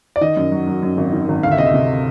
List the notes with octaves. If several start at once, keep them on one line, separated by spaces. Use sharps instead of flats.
D5
D#3 D#5
F#2
F#3
F#3
F#2
G#1
D#3
G#1
D2 F5
E5
C3 D#5
E5
C3